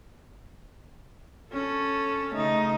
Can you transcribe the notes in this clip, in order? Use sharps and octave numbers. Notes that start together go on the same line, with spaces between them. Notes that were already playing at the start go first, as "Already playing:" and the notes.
C#4 A4
C#3 A3 D#4